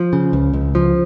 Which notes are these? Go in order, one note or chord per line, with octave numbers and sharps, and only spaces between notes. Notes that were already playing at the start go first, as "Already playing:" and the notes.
Already playing: F3
C#3
C#2
C#2
F3